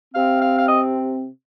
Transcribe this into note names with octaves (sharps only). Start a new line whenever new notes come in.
C3 C4 F5
F5
F5
D#5